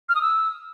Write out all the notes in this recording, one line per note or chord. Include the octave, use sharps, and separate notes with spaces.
F6
D#6
E6